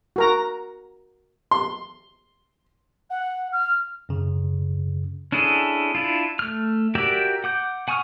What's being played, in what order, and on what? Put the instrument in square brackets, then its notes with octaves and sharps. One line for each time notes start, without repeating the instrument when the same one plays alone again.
[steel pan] F#4 A#4 A#5
[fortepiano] C6
[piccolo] F#5
F6
[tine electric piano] F#2 C#3
[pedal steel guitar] C#4 D4 E4 G#4 A4
D4 E4 F4
A3 F6
F#4 G4 A#4 D5 E5
F#5 D6 G6
F#5 G#5 C#6 D#6 F6